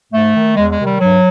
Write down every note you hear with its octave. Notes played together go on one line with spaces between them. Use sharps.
G#2 A3
D#3
E2 G#3
G#3
C3 D#3
G3
G2 F#3